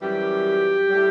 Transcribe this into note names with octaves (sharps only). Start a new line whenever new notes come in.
F#2 E3 G3 G4
A2 G3